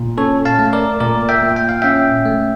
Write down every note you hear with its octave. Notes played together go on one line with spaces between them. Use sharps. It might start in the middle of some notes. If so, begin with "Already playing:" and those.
Already playing: A#2
C#4 A4 C#5
F5 A5
A3
A#4 D5
A#2 A#4 D5
E5 G5
A#2
G5
F5
C#4 E5 G5
A3